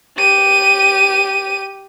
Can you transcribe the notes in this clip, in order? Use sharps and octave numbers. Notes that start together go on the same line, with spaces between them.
G4 D#7